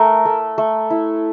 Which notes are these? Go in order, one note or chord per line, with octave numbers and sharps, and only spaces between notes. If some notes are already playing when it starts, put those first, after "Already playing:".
Already playing: A3 A#4
A3
A3
E4